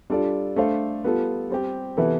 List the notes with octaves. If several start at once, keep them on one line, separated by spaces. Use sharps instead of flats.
G3 D4 F4 A4 D5
A3 D4 A4 C5 F5
G3 B3 F4 A4
G3 C4 G4
C3 E3 B3 E4 A4